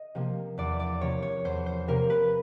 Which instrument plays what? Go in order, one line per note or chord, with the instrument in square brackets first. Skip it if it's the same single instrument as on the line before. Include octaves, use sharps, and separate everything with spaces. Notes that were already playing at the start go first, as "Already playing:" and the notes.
Already playing: [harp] D#5
C3 F3 A#3
E2 D5
D5
C3 F3 A#3 C#5
C#5
E2 C5
C5
C3 F3 A#3 A#4
B4